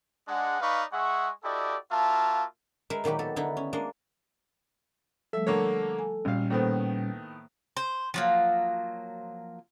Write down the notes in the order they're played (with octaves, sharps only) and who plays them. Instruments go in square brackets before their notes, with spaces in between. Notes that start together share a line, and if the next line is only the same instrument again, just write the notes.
[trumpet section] G#3 D4 F#5
D#4 B4 D5 F5 B5 C#6
G#3 G#4 E5 F#5 C#6
E4 F#4 G4 A4 D5 D#5
A#3 F4 F#4 E5 A5
[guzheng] G#3 A#4 B4 E5
A#2 D#3 F#3 G4 B4
B3 A4
D3 B3 D#4 E4
C#4
G#3 A#3 D4 D#5
[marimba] F3 G3 A3 [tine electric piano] A4 [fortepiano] E5
[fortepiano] D3 A#3 C#5 [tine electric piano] A4
[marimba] G#5
[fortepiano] G#1 F5 [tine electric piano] A#2 G3 C#4
[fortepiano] A2 D#3 B3 [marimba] A#3 A4 C5
[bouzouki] C5
F3 F#3 A#3